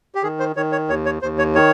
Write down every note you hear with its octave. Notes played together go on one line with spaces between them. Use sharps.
G4
D#3 G#4
C5
D#3 C#5
C#5
D#2 C#5
C#5
D#2 C5
C#5
D#3 C#5